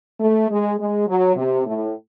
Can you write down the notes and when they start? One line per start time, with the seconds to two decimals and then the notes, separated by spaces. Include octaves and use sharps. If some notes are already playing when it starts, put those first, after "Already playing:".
0.20 A3
0.49 G#3
0.78 G#3
1.07 F#3
1.36 C3
1.66 A2